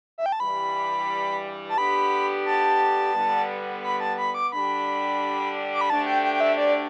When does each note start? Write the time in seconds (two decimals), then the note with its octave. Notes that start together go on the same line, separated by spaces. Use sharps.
0.18 E5
0.26 G5
0.32 A5
0.40 G2 E3 G3 B5
1.69 A5
1.77 D3 B3 D4 G4 B5
2.46 A5
3.15 D3 G3 B3
3.83 B5
4.00 A5
4.18 B5
4.34 D6
4.52 D3 G3 D4 G4 B5
5.74 D6
5.81 B5
5.90 D2 D3 A3 D4 G4 A5
6.06 G5
6.24 G5
6.34 G5
6.40 E5
6.58 D5